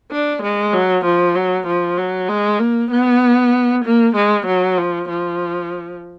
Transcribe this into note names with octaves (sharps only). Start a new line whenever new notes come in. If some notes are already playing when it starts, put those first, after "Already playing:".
D4
G#3
F#3
F3
F#3
F3
F#3
G#3
A#3
B3
A#3
G#3
F#3
F3
F3